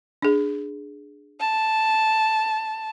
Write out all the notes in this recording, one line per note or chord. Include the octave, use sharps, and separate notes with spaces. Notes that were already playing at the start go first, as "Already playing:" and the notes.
D4 G#4
A5